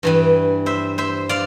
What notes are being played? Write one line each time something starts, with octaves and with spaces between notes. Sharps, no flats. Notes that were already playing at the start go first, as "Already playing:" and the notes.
G2 E3 G3
C5 E5
C5 E5
D5 F5